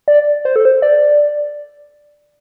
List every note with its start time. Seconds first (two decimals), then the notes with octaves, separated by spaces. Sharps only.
0.08 D5
0.45 C5
0.56 A4
0.65 C5
0.82 D5